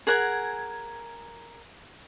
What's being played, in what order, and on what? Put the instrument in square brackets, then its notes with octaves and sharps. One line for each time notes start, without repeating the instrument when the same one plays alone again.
[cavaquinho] G#4 A#4 F#5 G#5